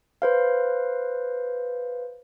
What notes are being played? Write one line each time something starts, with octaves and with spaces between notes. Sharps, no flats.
B4 C5 F5